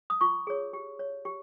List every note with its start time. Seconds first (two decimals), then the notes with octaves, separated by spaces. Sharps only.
0.10 D#6
0.21 F4 C#6
0.47 G#4 C#5
0.73 G4
0.99 C#5
1.25 G4